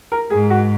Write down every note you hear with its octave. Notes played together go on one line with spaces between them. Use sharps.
A#4
G#2 G#4
F#4